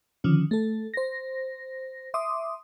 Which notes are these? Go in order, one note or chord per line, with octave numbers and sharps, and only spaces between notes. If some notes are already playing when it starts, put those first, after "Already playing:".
D3 D#3 F3 C#4
A3 A4
C5 A#6
E5 C6 D6 D#6